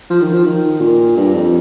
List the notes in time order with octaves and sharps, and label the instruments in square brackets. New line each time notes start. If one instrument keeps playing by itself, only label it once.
[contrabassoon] F3
D#3
F3
D#3
A#2
G2
F2